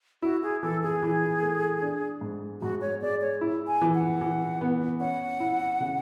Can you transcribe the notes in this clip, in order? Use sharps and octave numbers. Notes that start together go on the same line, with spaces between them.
E4 F#4
G#4
E3 A4
G#4
E3
A3
D4
G#2
G#2 F#4
C#5
G#3 D5
C#5
E4
G#5
E3
F#5
E3
B3
C#4 F#5
E4
C#3